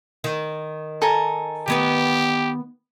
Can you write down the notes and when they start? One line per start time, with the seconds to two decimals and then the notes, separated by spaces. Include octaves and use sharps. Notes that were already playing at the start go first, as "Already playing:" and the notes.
0.24 D#3
1.02 A4 G#5 A#5
1.68 D#3 B3 G4 B4